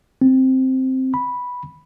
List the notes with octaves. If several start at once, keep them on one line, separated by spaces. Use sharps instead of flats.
C4
B5